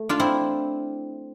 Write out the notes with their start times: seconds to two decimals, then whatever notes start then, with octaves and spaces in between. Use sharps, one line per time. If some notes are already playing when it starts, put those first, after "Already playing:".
Already playing: A3
0.09 D4 F4
0.20 C4 E4